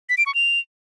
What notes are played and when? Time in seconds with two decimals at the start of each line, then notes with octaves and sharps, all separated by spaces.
0.09 B6
0.18 D7
0.26 C#6
0.34 F7